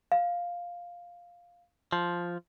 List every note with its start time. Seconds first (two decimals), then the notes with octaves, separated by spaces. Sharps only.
0.12 F5
1.92 F3